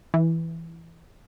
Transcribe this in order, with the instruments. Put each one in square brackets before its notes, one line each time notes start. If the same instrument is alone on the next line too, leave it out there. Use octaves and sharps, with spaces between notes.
[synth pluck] E3